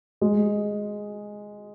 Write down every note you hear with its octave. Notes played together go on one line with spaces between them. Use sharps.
G#3